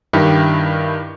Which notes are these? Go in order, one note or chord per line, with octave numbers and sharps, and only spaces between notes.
G2 D#3 E4 G4